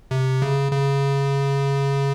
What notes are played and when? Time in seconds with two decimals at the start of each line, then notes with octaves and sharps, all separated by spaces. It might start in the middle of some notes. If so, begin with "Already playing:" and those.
0.11 C3
0.42 C#3
0.72 C#3